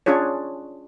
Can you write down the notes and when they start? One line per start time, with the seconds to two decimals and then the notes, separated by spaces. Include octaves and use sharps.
0.06 C#4 D4 F4 G#4 C#5